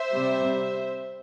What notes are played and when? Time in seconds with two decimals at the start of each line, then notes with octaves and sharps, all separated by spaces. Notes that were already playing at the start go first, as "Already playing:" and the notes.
Already playing: C5 E5
0.12 C3 G3